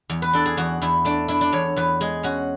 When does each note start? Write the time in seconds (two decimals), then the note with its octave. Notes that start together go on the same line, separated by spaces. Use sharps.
0.10 E2
0.22 B4
0.33 D4 A4
0.46 G#4
0.57 E2 F#4
0.82 E2 E4
1.05 A3 D4
1.28 D4 E4
1.41 D4
1.52 E2 C#5
1.76 E2 B4
2.01 G#3 G#4
2.23 C#4 F#4